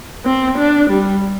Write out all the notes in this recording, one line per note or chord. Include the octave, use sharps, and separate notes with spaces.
C4
D4
G3